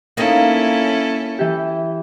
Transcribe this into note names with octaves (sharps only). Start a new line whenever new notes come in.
A#3 C4 C#4 D#4 E4 A4
E3 G4